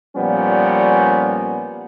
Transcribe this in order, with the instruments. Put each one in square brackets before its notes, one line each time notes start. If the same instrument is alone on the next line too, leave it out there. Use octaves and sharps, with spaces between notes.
[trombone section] A#2 F3 G3 B3 C#4